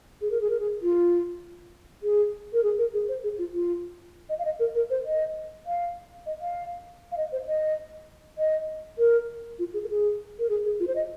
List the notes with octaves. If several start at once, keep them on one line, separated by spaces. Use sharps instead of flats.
G#4
A#4
G#4
A#4
G#4
F4
G#4
A#4
G#4
A#4
G#4
C5
G#4
F4
F4
D#5
F5
D#5
A#4
A#4
C5
D#5
F5
D#5
F5
F5
D#5
C5
D#5
D#5
A#4
F4
G#4
A#4
G#4
A#4
G#4
G#4
F4
C5
D#5